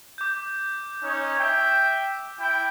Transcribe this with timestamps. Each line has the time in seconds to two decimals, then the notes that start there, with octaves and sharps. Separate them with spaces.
0.18 D6 G6
1.02 C#4 D#4 C#5
1.38 E5 G5
2.38 E4 G5